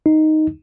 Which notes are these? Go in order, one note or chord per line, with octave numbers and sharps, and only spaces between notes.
D#4